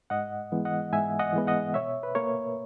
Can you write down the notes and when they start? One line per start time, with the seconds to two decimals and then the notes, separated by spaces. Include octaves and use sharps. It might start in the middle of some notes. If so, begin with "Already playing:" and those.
0.10 G#2 D#5 F#5
0.52 E3 G#3 B3
0.65 D#5 F#5
0.92 G#2 E5 G#5
1.19 D#5 F#5
1.33 E3 G#3 B3
1.47 D#5 F#5
1.74 B2 C#5 E5
2.03 B4
2.15 A#3 A#4 C#5